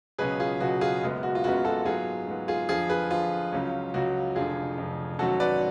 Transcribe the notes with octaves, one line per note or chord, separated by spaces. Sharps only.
C#2 B2 F#3 C#4 G#4 B4
F4 G#4
C#2 B2 F#3 C#4 F#4
F4 G#4
F#1 F#2 C#3 G#3 B3
F#4
F4
F#1 F#2 C#3 G#3 B3 F#4
F#4 A4
G#2 F#3 B3 F4 G#4
G#2 F#3 B3
F4 G#4
F2 D3 F3 F4 G#4
G#4 B4
F2 D3 F3 F4
C#2 C#3 F#3 C#4
C#2 C#3 F#3 C#4 F#4
F1 F2 D3 F4 G#4
F1 F2 D3
G#1 G#2 F#3 A3 C#4 F#4 A4
B4 D5